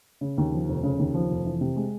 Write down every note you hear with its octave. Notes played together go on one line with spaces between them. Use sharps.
C#3
D#2
F3
F1
C#3
D#2
F3
F1
E3
C3
G#3